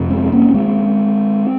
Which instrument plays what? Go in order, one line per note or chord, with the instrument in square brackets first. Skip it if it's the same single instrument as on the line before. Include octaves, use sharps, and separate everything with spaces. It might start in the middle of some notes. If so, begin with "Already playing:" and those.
Already playing: [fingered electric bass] F2 C3
G#3 C4
A#3 C#4
G#3 C4